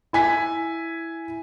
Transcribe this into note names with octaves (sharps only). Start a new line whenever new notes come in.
E4 G#5 B6